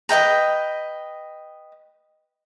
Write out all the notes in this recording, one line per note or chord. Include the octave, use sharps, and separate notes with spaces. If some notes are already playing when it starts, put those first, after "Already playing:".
B4 D#5 G5 A#5